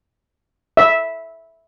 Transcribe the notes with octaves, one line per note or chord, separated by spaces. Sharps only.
E5